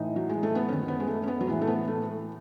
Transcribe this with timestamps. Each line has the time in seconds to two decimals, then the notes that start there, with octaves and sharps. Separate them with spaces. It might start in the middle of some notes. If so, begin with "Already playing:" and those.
Already playing: A2 E3 D#4
0.16 F#3
0.29 G#3
0.43 A3
0.55 B3
0.69 F#2 D#3 C#4
0.88 B3
1.00 G#3
1.08 A3
1.23 C#4
1.28 B3
1.41 F#3
1.47 A2 E3 G#3
1.61 A3
1.67 B3
1.88 A3